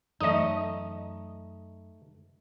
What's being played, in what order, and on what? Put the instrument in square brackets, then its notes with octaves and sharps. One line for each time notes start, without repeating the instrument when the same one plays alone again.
[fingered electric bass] F#2 [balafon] E3 A4 D5 [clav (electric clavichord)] A3 D#4 [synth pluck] D#5 D#6